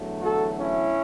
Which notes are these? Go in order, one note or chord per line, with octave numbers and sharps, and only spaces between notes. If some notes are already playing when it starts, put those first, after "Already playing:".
Already playing: E2 D3 F#3 A3
F#4 A4
C#4 E4